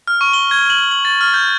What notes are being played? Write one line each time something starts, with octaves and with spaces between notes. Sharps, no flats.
F6
C#6
G7
G#6
F#7
F#7
A6
F6
G6